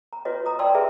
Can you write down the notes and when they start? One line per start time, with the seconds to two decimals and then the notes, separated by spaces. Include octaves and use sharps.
0.13 A#5
0.25 F4 F#4 B4 C#5 D#5
0.46 A#5 D#6
0.59 D5 G5 A5 C6 E6
0.74 G4 G#4 B4 E5 A#5